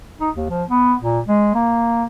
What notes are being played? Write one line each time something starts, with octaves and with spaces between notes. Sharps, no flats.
D#4
D#2
F3
B3
A#2
G#3
A#3